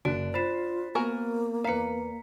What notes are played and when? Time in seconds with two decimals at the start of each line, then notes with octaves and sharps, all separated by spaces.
0.05 F#1 D4 F#4 F#6 D7
0.34 F4 C5 B5 A6 B6 C7 E7
0.95 A#3 B3 F#4 A#4 G#5
1.64 E2 B4 F5 A#5 B6 C#7